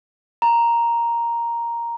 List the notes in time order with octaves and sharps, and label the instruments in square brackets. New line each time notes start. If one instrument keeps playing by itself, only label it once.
[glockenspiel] A#5